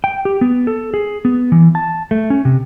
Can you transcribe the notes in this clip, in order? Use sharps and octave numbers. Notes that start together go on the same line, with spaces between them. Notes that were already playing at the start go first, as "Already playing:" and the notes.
G5
G4
B3
A4
G#4
B3
E3
A5
A3
C#4
C3